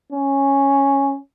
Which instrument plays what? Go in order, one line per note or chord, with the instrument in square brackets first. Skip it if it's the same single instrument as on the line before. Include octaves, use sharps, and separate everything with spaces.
[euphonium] C#4